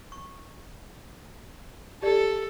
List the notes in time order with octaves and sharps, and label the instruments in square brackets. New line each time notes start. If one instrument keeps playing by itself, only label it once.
[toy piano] C#6
[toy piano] G4 D5 [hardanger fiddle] A4